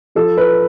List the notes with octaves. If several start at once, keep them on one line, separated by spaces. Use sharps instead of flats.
F3 A4
B4